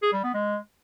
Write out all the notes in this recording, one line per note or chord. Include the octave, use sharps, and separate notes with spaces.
G#4
G3
B3
G#3